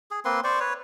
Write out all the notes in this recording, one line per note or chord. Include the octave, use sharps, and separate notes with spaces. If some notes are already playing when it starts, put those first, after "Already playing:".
G#4
A#3 C4 B4 C6
C5 D5 C#6
B4 C#5